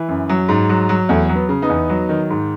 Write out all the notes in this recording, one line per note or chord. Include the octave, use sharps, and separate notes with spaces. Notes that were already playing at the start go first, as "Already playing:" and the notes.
Already playing: E3
F#2
F#3
G#2
F#3
F#3
E2 A3
F#3
B3
C#3
B3 D#4
E2
F#3
D#3
G#2